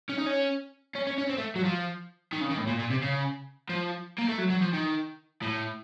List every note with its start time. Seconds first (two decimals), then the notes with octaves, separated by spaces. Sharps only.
0.10 C#4
0.18 D#4
0.27 C#4
0.96 C#4
1.07 C#4
1.18 C#4
1.30 C4
1.38 A3
1.56 F#3
1.65 F3
2.33 D#3
2.41 C#3
2.50 D#3
2.58 A2
2.67 A#2
2.79 A#2
2.90 C3
3.02 C#3
3.70 F3
4.19 A#3
4.29 A3
4.39 F#3
4.50 F#3
4.61 F3
4.73 D#3
5.42 A2